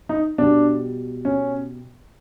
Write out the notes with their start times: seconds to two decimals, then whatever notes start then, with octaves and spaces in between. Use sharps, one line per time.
0.09 D#4
0.38 B2 G3 D4
1.25 C#4